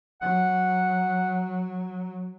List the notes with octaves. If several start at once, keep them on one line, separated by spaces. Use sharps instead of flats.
F#3 F#5